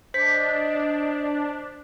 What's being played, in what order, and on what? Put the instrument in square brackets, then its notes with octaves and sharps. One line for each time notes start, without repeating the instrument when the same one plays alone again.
[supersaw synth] D4 [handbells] C5 B6 [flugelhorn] D#5